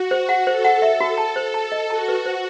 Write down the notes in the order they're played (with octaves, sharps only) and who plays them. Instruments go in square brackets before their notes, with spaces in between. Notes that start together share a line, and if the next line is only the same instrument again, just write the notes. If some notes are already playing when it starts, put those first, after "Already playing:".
Already playing: [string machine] F#4
[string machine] F#4 [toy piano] C5
[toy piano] F#5
[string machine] A4 [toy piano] C5
[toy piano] F#5
E5
F#4
A5
C5
[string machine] A4 [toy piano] A5
[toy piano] D#5
[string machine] F#4 [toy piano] A5
[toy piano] B4
C5